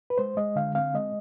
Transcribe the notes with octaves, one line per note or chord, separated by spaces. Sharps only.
B4
G#3 C5
G#3 D#5
D3 F5
C4 F5
G#3 D#5